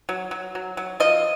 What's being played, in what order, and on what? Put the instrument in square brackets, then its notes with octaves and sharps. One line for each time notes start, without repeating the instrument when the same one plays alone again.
[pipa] F#3
F#3
F#3
F#3
F3 D#5